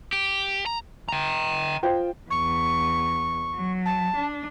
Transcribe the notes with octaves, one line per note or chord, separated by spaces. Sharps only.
G4
A#5
G5 A#5
F4 C5 G5
E2 C#6
F#3
A5
D4